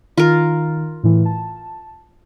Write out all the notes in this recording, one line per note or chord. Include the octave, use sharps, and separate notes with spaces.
D#3 F4 A#4
A2 E3
A5